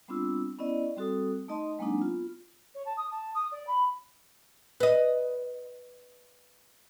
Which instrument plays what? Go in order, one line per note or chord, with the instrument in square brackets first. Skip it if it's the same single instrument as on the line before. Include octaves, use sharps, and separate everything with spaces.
[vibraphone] G3 B3 C4 D4 F4 E6
B3 C#4 E4 D5 D#5
G3 C4 F#4 A4 D#6
A3 D#4 D#5 A5 C6 D#6
F#3 G#3 A#3 C4 D4 D#4
B3 F4
[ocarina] C#5
A5
D#6
A5
D#6
D5
B5
[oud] B4 D#5